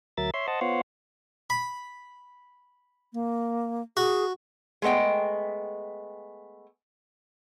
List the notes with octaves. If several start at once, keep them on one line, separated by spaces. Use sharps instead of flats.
D2 F#3 A#4 E5 A6
C#5 E5 C6
C5 D#5 F#5 A5
B3 F4 C5 C#5 F5 F#5
B5
A#3
F#4 G#4
G#3 A3 B3 D#5 G5